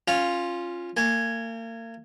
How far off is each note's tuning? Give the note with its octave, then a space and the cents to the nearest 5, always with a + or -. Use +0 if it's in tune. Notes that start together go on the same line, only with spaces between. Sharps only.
C#4 -15 F4 +0
A#3 -40 G#5 +0